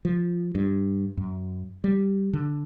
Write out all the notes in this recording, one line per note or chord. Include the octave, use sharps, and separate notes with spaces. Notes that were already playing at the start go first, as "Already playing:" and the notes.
F3
G2
F#2
G3
D3